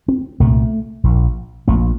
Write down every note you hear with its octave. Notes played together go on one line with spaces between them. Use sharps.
C4
C2 A#2 A3
A#1 A#2
A#1 A#2 A3